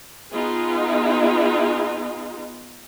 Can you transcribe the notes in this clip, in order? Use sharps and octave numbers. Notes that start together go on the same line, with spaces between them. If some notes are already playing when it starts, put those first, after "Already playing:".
B3 D#4 F4 G#4